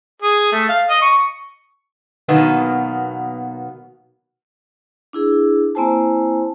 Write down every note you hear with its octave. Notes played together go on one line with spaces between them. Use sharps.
G#4
A3
F5
D#5
C#6
B2 D#3 F#3 A#3 B3
D4 E4 G#4
A#3 C4 E4 C5 G#5 A5